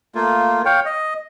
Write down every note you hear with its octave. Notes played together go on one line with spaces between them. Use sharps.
A3 A#3 F4
C#5 F5 G5
D#5